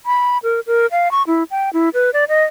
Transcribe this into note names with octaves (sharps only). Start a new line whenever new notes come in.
B5
A#4
A#4
F5
C#6
E4
G5
E4
B4
D5
D#5